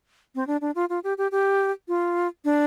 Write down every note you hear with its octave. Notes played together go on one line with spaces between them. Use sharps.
C4
D4
D4
F4
F4
G4
G4
G4
F4
D4